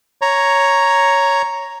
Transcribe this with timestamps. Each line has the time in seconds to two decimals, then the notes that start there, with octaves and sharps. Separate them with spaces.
0.22 C#5 A#5